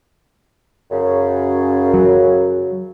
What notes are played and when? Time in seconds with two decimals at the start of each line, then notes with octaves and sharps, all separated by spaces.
0.91 F#2 C#3
1.94 F#3